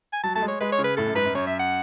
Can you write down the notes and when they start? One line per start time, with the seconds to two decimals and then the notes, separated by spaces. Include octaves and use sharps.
0.13 G#5
0.23 F#3 A5
0.35 A3 A5
0.42 G#3
0.48 C#5
0.60 G#3 B4
0.72 C#5
0.79 C#3
0.84 B4
0.97 A2 A4
1.07 F#2
1.15 G#2 B4
1.25 F#2
1.35 F#2 C#5
1.47 E5
1.59 F#5